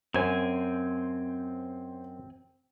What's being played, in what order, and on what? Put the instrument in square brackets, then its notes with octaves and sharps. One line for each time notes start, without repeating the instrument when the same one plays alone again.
[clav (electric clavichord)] F#2 [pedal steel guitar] C4 G#5 [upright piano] C5